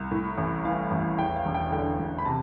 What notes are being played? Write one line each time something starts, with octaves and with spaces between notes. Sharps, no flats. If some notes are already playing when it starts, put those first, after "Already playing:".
Already playing: C2
A2
A1
E3 F5
A1
E2 G5
F5
E1
G5
D3 G5
E1
B5
C3 A5